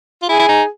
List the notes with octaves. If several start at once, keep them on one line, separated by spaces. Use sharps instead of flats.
F4
E4 G#4
E4
D#4